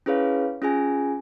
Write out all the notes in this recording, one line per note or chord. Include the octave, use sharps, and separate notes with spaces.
C#4 E4 G#4 B4 C#5 F5
C#4 F4 G#4 G#5